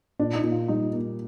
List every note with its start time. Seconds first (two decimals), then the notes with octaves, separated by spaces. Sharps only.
0.19 A#2 D4
0.35 D#4
0.44 A#2
0.52 F4
0.68 G3 D#4
0.93 A#3